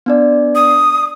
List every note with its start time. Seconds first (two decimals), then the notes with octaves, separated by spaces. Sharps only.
0.06 B3 D4 D5
0.55 D#6